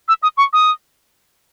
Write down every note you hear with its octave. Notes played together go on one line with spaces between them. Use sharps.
E6
D#6
C#6
D#6